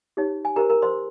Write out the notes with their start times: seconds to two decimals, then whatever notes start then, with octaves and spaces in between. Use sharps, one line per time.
0.17 D#4 G4 C#5
0.45 G#5
0.56 G4 A#4 C5 A#5
0.70 A#4 A#5
0.82 C5 C6